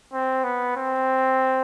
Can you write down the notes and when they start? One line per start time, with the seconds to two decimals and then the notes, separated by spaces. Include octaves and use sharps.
0.13 C4
0.44 B3
0.76 C4